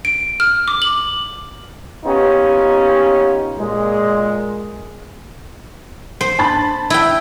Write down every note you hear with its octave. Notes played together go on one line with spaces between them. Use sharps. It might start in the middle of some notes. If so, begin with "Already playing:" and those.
D7
F6
D6
F#7
B3 C#4 D#4 F4 G4
A#2 G#3
C5
A5 B5 A6
E4 G5